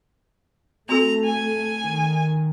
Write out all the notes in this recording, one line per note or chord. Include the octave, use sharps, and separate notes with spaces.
A3 C4 F#4 A4 A#5
G#5
D#3